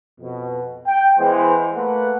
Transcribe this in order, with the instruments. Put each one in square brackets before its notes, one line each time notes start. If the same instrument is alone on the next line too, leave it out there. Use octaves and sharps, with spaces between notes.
[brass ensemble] F2 B2
G5
E3 G#3 B3 C5
A3 A#3 B4 F#5